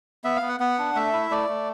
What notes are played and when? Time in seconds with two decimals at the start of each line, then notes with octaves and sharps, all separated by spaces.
0.24 B3 E5
0.36 F5
0.42 B3
0.48 F#5
0.60 B3 F#5
0.78 D4
0.95 A3 E5
1.13 E4
1.31 A3 D5
1.49 A3